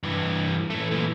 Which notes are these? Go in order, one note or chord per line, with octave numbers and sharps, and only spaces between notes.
G2 E3
E3 A3
A#2 E3